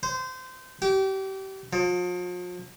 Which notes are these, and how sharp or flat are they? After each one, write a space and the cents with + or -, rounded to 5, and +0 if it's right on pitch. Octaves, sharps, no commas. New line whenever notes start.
C5 -25
G4 -30
F3 +40